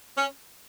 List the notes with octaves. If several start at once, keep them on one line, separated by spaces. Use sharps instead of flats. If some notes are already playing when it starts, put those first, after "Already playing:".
C#4